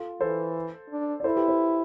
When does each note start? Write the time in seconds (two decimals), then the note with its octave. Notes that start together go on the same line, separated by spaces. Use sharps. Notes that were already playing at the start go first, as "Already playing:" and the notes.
Already playing: F4 A4
0.21 E3 A4 C5
0.90 D4
1.20 D5
1.24 E4 A4 C5
1.36 G4 B4
1.48 A4 C5